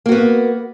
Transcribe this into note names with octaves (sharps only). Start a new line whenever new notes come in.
A#3 B3 F#4